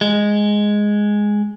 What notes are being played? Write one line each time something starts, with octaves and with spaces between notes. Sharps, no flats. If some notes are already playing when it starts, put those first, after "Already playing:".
G#3